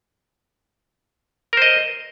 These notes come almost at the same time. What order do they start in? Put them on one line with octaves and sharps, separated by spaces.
A#4 C5 D#5